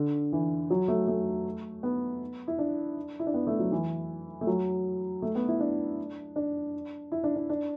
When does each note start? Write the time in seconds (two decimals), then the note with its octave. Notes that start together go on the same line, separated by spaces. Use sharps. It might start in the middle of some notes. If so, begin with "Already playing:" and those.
Already playing: D3
0.33 E3
0.70 F#3
0.88 A3
1.08 A3
1.83 B3
2.48 E4
2.58 D4
3.20 E4
3.26 D4
3.34 B3
3.47 A3
3.59 F#3
3.72 E3
4.41 A3
4.47 F#3
5.22 A3
5.35 B3
5.48 E4
5.60 D4
6.36 D4
7.12 E4
7.24 D4
7.36 D4
7.50 D4